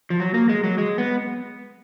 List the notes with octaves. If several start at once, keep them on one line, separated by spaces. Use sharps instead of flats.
F3
F#3
A#3
G#3
F#3
G#3
B3